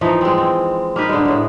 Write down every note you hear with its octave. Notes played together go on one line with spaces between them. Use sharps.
E3 F3 D#4
G#3 C4
C4
A#3 D#4 B4
D3 G#3
A2 G#3